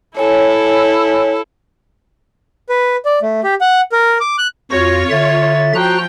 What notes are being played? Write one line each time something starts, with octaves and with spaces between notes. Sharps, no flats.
E4 A4 C#5 G#5
B4
D5
A3
G4
F#5
A#4
D6
F#6
F2 F4 F#4 C#5 A#6
D3 E5 A6
F3 F#4 G5 A#5 F#6